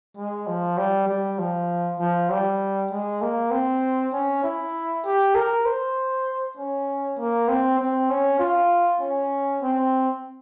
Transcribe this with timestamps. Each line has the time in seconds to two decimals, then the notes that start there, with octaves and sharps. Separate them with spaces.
0.17 G#3
0.47 F3
0.78 G3
1.08 G3
1.39 F3
1.99 F3
2.30 G3
2.91 G#3
3.22 A#3
3.51 C4
4.13 C#4
4.44 E4
5.05 G4
5.35 A#4
5.66 C5
6.57 C#4
7.18 A#3
7.48 C4
7.80 C4
8.10 C#4
8.39 F4
9.01 C#4
9.62 C4